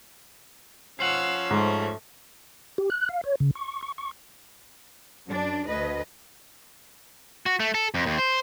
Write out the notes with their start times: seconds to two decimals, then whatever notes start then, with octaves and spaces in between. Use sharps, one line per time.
1.00 F3 C#4 C5 F5 F#5 E6
1.50 G#2 A3
2.78 G4
2.90 F#6
3.09 F5
3.24 C#5
3.40 C#3
3.55 C#6
3.83 C#6
3.98 C#6
5.28 F#2 D4 D5
5.66 D2 B4 D#5
7.46 F#4
7.60 A3
7.74 A4
7.94 F2
8.06 D#2
8.18 C5